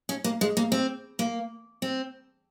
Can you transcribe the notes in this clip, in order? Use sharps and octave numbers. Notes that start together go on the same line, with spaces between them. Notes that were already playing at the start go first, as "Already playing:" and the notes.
C#4
A#3
G#3
A#3
C4
A#3
C4